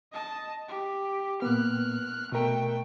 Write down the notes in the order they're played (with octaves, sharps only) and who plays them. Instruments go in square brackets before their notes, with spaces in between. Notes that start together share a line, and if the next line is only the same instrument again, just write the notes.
[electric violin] D#5 A5
G4
[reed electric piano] A#2 A#3 B3 [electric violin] F6 F#6
[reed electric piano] B2 A#4 [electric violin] A3 G5